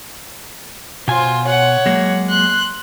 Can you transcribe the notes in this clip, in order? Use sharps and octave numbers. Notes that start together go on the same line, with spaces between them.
B2 F4 C5 G#5
C#5 F#5
F#3 G#3 A#3
C6 F#6